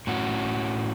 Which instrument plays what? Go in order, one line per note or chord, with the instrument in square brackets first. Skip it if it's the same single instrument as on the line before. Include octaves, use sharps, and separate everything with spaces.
[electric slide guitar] A2 C#4 F#4